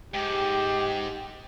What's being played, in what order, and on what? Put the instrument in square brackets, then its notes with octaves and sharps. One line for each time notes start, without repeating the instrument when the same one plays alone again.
[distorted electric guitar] G#2 [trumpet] G4 [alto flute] G5